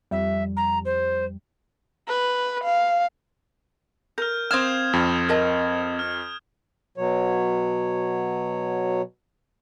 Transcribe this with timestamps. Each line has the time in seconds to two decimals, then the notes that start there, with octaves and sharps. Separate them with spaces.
0.11 F2 G3 E5
0.56 A#5
0.85 C5
2.08 B4
2.64 F5
4.18 A#4 F6 G6
4.51 C4 F5 D#6 F6 G#6 E7
4.93 F2
5.29 A#4 D#5 A5
5.99 F6
6.98 B2 F#3 C#5